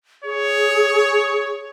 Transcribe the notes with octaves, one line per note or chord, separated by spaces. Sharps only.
G#4 C#5